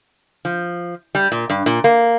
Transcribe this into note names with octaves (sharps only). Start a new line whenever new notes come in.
F3
G3
A#2
G2
A#2
A#3